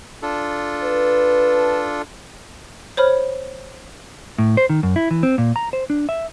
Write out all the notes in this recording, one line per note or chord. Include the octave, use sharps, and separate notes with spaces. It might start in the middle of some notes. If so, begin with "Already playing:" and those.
D4 F4 A4
B4
C5 C#5 B5 F6
A2
C5
D#3
F#2
E4
E3
C4
A#2
A#5
C5
D4
E5